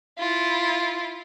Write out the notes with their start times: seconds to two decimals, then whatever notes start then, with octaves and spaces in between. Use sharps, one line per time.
0.18 E4 F4